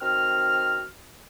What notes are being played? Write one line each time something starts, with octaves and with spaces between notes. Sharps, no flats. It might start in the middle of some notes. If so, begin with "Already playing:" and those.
D#3 C4 F#4 F6